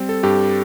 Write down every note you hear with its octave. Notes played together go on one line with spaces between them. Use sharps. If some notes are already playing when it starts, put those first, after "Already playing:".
Already playing: G3 C4
A4
G2 G4